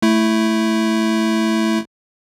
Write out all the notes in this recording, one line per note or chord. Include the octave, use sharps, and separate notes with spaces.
A3 E4